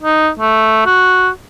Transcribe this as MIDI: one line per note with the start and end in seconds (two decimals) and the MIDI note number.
0.03 0.30 63
0.39 0.83 57
0.86 1.29 66